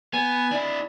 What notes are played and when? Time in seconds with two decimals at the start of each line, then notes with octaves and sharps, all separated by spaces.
0.13 B3 G#5
0.51 D4 E4